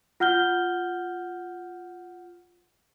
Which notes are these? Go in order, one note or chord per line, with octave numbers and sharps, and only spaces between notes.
F4 F#5 F6 G6 G7